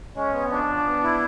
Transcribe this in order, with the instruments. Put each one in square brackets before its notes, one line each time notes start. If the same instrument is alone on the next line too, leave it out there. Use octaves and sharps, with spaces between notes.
[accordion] G#3 [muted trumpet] C#4
[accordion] B3
[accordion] F3 [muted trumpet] D4
[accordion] F3
B3
E4